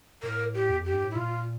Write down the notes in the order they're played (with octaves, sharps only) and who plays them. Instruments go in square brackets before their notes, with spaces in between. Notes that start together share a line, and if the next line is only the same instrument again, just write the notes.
[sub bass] A2 [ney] A#4
[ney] G4
[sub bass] E2
[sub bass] F2 [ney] G4
[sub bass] G2
A2
[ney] E4
[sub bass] A#2 [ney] F4